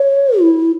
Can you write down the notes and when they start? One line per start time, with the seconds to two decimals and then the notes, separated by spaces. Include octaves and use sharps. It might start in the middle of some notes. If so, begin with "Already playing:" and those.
Already playing: C#5
0.41 E4